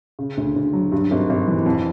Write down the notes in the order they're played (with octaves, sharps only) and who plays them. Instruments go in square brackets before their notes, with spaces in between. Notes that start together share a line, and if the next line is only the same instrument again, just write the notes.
[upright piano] C#3
D2
D2
F#3
G2
G#1
G#1
E3
F2